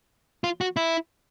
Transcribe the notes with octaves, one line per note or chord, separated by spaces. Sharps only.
F4
F#4
E4